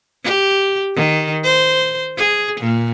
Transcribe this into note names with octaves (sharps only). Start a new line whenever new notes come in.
G4
D#3
C5
G#4
A#2